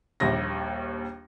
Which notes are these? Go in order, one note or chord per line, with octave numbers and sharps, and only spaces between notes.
A#1 D#2 G3 A#6